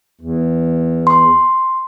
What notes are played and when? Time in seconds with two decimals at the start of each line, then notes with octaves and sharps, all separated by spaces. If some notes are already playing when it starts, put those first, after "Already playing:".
0.21 E2
1.07 C6